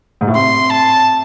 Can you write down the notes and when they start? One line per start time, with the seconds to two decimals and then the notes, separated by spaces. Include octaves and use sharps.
0.21 G#2
0.28 A2
0.35 C3 C6
0.70 A5